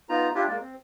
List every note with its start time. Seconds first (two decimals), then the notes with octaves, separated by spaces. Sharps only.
0.09 B3 D#4 F4 A#5
0.35 D4 E4 F4 G4
0.48 G#3 A#3 D5
0.60 C4